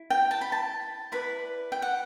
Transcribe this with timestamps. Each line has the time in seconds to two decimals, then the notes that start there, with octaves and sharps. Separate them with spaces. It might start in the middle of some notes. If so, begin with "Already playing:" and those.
Already playing: E4
0.10 G5
0.31 A5
0.41 B5
0.52 A5
1.12 E4 B4 D5 B5
1.72 G5
1.82 F#5